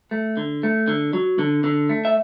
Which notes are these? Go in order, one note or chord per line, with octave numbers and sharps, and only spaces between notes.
A3
D3
A3
D3
F#3
D3
D3
A3
E5